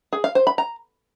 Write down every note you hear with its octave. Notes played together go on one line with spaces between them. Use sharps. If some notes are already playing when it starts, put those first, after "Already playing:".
G#4
F5
C5
B5
A#5